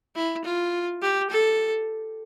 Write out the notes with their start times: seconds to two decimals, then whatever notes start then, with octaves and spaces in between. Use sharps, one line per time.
0.16 E4
0.44 F4
1.02 G4
1.30 A4